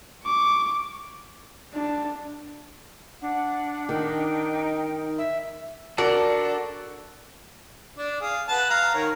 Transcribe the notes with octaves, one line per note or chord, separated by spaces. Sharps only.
C#6 D6
D4
D4 F#5
D#3 D#4 G5
E5
D4 F#4 A4 A#4 D5 F#5
D4
G#4 F5
B4 F#5 A5
F5 A#5
D#3 A#4 C#5